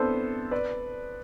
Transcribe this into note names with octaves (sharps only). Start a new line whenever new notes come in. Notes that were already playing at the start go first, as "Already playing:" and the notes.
Already playing: B3 C4 D4 E4 A4 C5
B4 D5